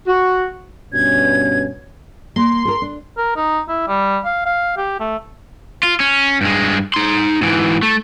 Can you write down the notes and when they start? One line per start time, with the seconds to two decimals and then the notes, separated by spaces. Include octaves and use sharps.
0.07 F#4
0.93 G2 B2 C#4 G#6
2.36 A#3 C6
2.65 A4 A#4
2.82 D4
3.18 A#4
3.37 D#4
3.69 E4
3.88 G3
4.25 F5
4.46 F5
4.78 G4
5.00 A3
5.83 F4
6.00 C#4
6.41 G2 G#3
6.94 D#4 C6
7.41 G#2 E3
7.83 A3